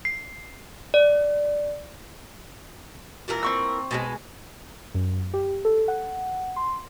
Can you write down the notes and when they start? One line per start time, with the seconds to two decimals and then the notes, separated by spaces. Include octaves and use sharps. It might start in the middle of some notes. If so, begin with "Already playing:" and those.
0.05 C7
0.94 D5
3.28 A#2 E3 A#4
3.43 C4 C#6 E6
3.91 B2 G3 G#3
4.94 F#2
5.34 G4
5.65 A4
5.88 F#5
6.56 C6